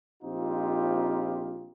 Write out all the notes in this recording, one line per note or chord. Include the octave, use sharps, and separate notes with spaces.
A#1 C4 D#4 F4 G4